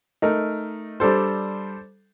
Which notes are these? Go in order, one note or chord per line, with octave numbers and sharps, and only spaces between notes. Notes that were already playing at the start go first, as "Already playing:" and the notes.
A3 D#4 A#4
G3 D4 A4 C5